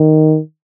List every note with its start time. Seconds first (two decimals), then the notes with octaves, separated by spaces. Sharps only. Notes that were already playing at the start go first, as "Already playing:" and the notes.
Already playing: D#3